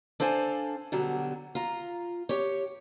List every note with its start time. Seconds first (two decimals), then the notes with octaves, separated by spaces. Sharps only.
0.20 D4 A4 C5 F5 G#5
0.92 B2 D3 F#3 G3
1.55 F4 A#5
2.29 G4 C#5